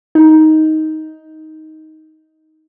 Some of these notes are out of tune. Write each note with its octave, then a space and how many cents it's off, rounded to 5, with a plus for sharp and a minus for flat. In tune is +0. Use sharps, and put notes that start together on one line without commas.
D#4 +10